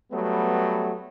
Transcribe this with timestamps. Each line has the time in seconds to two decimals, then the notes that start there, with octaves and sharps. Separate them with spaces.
0.12 F#3 G3 A3 B3